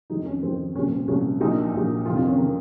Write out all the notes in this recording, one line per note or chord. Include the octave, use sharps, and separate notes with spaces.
F2 D#3 F#3 D#4
C#4
F2 D#3 F#3 C4
C2 A#2 F#3 C#4
C4
C2 A#2 F#3 C#4
A#1 A#2 F#3 D#4
A#1 A#2 F#3
F2 C3 D#3 F4
F4
C#4
C3 D#3 A#4